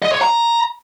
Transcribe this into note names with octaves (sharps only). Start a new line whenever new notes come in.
D#5
C#5
A#5